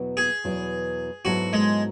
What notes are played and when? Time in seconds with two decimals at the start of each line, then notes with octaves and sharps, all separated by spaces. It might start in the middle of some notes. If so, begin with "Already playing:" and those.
Already playing: E2 B2 F#3 B3 E4
0.17 G#4
0.44 E2 B2 F#3 B3 E4
1.25 G#2 F#3 B3 E4 F#4 A4
1.53 G#3